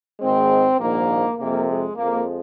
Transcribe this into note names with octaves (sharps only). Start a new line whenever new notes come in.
G#1 G#2 D#3 G#3 C4
A#1 G#2 D#3 A#3
F2 C3 G#3 A#3
G#3
F2 F3 G#3 A#3